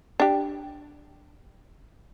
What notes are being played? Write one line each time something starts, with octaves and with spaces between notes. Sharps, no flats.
D4 G4